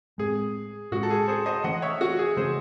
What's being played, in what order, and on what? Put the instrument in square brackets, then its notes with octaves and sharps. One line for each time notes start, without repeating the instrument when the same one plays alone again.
[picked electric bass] A2 G#3 C4 [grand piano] G#4
[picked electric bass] A2 G#3 C#4 [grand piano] F#4
[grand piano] A4
G#4
G#4 C5
C5 D#5
[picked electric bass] E3 A3 C#4 [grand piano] D#5 F#5
[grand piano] C#5 E5
F#4
G#4
[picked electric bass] C#3 E3 A3 C#4 [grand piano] G#4 C5